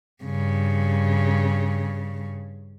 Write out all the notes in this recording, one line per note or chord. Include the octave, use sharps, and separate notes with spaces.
G2 C#3